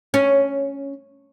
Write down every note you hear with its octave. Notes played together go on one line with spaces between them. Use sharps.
C#4